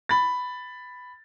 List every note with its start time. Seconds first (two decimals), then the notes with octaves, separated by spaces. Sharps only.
0.09 B5 A6